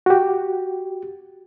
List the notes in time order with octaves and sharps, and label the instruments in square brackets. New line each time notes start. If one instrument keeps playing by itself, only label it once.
[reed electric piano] F#4 G4